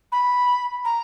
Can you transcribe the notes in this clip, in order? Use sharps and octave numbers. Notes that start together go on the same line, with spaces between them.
B5
A#5